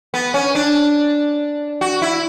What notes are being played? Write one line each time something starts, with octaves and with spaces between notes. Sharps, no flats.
B3
C#4
D4
F#4
E4